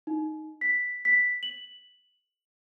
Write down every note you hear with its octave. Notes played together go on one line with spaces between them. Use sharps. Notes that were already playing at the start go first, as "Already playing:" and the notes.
D#4
B6
B6
F#7